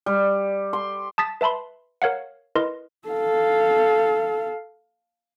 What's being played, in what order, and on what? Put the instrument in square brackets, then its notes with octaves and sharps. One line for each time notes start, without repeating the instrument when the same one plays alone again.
[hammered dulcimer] G3
C6
[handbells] A5 D#6 A6 B6
B4 E5 A5 B5 C6
A#4 C#5 F5 F#5
E4 A#4 B4 D#5 C6
[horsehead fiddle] A4 F5